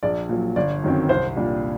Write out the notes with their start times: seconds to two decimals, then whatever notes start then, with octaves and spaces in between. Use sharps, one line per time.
0.03 A#1 D5
0.29 A#2 F#3
0.56 G1 D5
0.84 F#2 D#3 F#3 C4
1.09 C2 C5
1.36 A#2 G3 D4